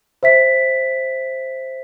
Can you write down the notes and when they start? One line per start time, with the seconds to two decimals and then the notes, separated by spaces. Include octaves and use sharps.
0.23 C5 E5 B6